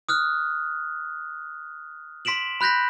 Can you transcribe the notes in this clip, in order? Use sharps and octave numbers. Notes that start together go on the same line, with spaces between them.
D#6 F6 F#6
C6 B6 D7 E7 F#7
B5 F#6 G6 A#6 B6